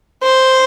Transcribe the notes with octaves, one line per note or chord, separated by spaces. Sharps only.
C5